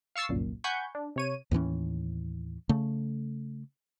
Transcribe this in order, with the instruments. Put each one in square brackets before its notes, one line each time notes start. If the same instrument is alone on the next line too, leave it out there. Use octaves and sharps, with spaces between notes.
[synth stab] F5 C#6 E6 A6 C7
G1 C2 F#2 A#2
F#5 G#5 B5 C#6 G6
D4
C3 C#5 D#7
[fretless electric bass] D#2 A2 E3 C#4
C#3 A3